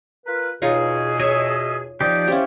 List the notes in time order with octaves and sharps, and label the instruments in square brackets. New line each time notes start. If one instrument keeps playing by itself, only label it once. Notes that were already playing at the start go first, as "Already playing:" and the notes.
[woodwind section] F4 A#4 B4
[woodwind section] E2 B2 [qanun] D#4 F4 C#5 [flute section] G#4
[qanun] C#5 [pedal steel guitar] D#5 E5
[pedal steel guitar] F3 D#4 G4 [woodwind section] C4 D5
[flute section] C#4 C5 F5 [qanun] E4 G4